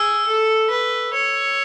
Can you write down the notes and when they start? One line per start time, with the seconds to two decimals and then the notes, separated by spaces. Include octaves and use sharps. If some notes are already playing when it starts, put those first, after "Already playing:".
Already playing: G#4 E6
0.27 A4
0.70 B4
1.13 C#5